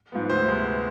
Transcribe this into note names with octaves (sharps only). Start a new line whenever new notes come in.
G#2 F3 G#3 B3
D2 C5
C3 G#3 B3